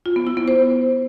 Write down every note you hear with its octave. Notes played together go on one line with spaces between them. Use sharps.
F4
B3
E4
B3
C5